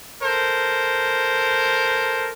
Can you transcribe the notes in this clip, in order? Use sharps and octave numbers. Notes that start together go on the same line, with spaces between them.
A4 A#4 C5